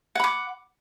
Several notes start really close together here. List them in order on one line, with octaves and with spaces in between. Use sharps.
F#5 B5 D6